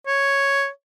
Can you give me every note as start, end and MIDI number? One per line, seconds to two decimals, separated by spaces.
0.07 0.68 73